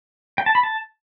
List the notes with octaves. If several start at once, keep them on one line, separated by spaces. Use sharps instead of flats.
G5
A5
B5
A5